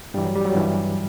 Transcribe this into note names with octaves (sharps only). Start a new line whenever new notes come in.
G2 E3 G3
F#3
G3
F#3
G2 E3